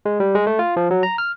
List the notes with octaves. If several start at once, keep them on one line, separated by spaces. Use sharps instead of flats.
G#3
G3
G#3
A3
F4
F3
F#3
A#5
F6